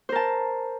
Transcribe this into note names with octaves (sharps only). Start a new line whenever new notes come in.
A#4 C5 A5